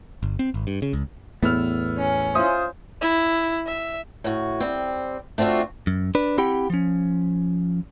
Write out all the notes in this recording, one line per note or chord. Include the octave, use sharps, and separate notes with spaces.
G1
C4
G#1
G2
C#3
C#2
E2 A2 B3 E6 F6
C#4
F4 C5 E5 D#6
E4
E5
A2 F#4
G3 C4
A3 C4 D4 F4 F#4
F#2
D4 B4
C4 E4 G4 F#5 G5 B5
F3 C#4